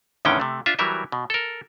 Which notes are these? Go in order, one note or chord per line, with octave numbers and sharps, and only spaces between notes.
E2 A2 D3 D#3 C#4 G5
C3 A3
D4 F4 E5
E3 F#3 G3 A#4 E5
B2
A4 A#4